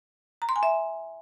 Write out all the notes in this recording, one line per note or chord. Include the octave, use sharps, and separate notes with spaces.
A#5
C6
G#5
E5